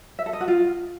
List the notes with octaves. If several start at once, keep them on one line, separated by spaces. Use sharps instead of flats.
E5
A4
D#5
F#4
F4